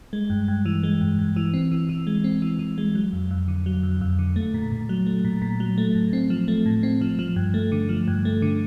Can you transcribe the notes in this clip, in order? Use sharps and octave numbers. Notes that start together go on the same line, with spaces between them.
G#3
G2
G2
E3
G#3
G2
G2
E3
C4
E3
E3
G#3
C4
E3
E3
G#3
F#3
F2
F2
D3
F#3
F2
F2
D3
A3
A#2
A#2
F#3
A3
A#2
A#2
F#3
A3
A2
C4
F3
A3
A2
C4
F3
F3
G2
A3
D3
F3
G2
A3
D3